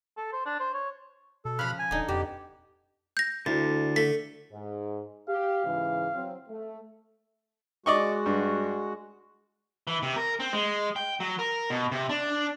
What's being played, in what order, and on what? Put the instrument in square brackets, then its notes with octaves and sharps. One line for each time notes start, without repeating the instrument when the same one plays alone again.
[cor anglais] A4
C5
D4
C5
C#5
[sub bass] B2 [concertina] A4
[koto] C#3 F3 [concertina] B5 F6 F#6
[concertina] G#5
[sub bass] D#1 [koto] D3 D#4
[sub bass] F2 [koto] B2 [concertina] G4
[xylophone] G6 A#6
[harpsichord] D2 [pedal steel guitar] D3 [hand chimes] E4 A6
[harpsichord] A3 [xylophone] B6
[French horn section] G#2
[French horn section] G4 [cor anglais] F5
[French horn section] G#2 C#3 E3
F#3 C4
A3
[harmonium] G#3 F#4 [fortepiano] D5 D#5 C#6
[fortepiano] G2
[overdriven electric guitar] E3
C3
A#4
C4
G#3
G5
F#3
A#4
B2
C3
D4